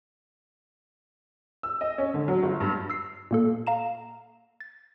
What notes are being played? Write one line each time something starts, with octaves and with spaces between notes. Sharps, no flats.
E6
D#5
C#4
D3
F#3
G1
G2
E6 C7
A#2 A#3 A4
F5 A#5 E7
A6